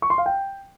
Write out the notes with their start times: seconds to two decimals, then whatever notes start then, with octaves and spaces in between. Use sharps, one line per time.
0.02 C#6
0.10 C6
0.18 F5
0.26 G5